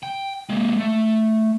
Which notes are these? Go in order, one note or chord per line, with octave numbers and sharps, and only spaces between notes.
G5
G#3 A#3
A3